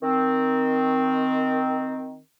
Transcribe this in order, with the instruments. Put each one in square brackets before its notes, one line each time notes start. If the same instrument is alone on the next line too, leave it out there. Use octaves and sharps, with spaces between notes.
[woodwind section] D#3 C4